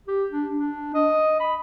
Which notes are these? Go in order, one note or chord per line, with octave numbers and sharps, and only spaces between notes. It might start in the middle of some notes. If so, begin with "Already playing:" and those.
G4
D4
D4
D#5
B5